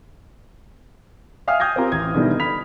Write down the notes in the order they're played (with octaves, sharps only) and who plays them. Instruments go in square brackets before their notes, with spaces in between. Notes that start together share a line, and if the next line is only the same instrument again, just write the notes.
[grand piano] E5 F5 G5 G#5 D#6 F6
G5 D#6 G6 G#6 A#6
C4 F4 G4 A#4
A1 G#6
B2 D3 D#3 G3 E4
B5 F6 B6 F7